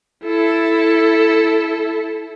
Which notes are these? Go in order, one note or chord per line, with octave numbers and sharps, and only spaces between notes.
E4 A4